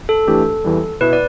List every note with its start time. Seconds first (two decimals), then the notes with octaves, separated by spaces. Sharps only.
0.09 A4
0.27 E3 A3 D4 G4
0.65 E2 E3 G3
1.01 B2 B3 E4 B4
1.13 D5